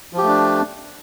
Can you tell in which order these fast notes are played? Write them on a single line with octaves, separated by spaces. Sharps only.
F3 G4 A3 D4